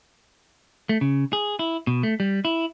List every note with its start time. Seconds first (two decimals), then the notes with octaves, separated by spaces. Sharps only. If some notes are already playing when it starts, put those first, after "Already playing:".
0.89 A3
1.01 C#3
1.33 G#4
1.59 E4
1.87 B2
2.03 A3
2.20 G3
2.45 E4